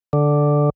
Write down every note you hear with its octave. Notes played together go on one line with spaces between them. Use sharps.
D3